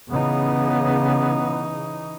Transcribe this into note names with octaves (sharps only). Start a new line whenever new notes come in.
C#3 E3 B3 D#4